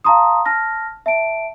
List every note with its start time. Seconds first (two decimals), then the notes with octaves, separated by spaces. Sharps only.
0.04 F5 A5 A#5 C6 D#6
0.45 A5 F6 A#6
1.06 E5 A5 D7